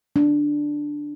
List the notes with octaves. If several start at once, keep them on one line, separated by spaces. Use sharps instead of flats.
D4